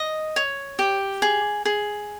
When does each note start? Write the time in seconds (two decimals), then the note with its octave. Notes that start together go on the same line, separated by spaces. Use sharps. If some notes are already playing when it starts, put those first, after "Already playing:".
Already playing: D#5
0.36 C#5
0.79 G4
1.22 G#4
1.65 G#4